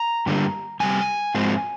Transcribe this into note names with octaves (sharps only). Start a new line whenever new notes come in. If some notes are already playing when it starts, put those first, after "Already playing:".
Already playing: A#5
G2 D3 G3 A#3
F2 C3 G3 G#5
G#2 F3 G#3 C4